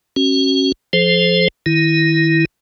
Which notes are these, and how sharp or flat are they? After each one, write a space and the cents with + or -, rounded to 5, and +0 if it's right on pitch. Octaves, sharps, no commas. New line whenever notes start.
C#4 -25 F#4 +20
F3 +0 A4 -40 C5 +0
D#3 +0 E4 +0